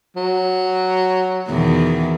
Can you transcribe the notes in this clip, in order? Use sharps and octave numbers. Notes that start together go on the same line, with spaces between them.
F#3
E2 B2 D#3